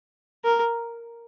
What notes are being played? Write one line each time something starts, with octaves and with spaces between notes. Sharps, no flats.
A#4